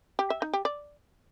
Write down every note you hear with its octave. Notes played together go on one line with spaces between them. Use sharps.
G4
E5
D#4
G4
D5